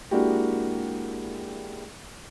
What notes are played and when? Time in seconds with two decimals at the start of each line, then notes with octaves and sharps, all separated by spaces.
0.11 G#3 A#3 D4 E4 F#4 G4